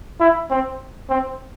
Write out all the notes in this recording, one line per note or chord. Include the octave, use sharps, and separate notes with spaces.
E4
C4
C4